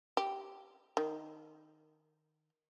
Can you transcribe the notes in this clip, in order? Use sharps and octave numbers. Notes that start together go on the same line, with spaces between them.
G4
D#3